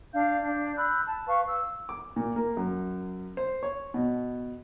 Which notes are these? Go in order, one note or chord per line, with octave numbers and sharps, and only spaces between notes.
D4 F5 G6
D4 G6
B5 E6 F#6 G6
A5
B4 F5 C#6
E6
D6
A#2
A#3
F#2
C5
C#5
B2